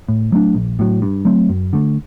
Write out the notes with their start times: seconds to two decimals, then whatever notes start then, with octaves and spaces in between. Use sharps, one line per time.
0.09 A2
0.32 F#3 A3 D4
0.55 A#1
0.79 A2 F#3
1.02 G2
1.25 F#3 A3 C4
1.49 F#2
1.73 D3 A3